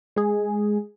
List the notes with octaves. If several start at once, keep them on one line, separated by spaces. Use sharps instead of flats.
G#3 G#4